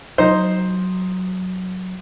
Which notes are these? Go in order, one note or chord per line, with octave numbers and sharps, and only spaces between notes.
F#3 D#4 C5